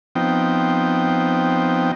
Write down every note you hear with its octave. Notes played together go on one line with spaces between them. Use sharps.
F3 B3 C4 D#4 G5